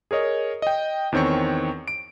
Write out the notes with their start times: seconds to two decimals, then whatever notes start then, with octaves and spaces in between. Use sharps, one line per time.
0.11 G#4 A#4 C#5 D#5
0.62 D#5 G5
1.12 E2 D#3 C4 C#5 C#6
1.88 D7